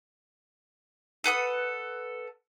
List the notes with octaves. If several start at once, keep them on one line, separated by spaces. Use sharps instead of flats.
A4 B4 F#5 D#6